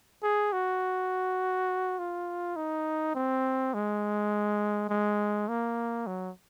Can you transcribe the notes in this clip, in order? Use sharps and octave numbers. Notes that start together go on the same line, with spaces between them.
G#4
F#4
F4
D#4
C4
G#3
G#3
A#3
F#3